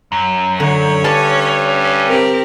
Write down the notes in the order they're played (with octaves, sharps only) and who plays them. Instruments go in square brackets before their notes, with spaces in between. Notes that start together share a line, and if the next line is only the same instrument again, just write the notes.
[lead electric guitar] F#2
[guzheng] D3 [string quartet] C#5
[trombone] G2 [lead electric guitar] C#4 [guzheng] D5 F5 A5
[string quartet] C4 G4 A#4